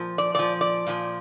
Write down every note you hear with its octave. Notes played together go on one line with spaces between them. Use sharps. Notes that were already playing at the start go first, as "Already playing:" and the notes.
Already playing: A#2 F3
D5
A#2 F3 D5
D5
A#2 F3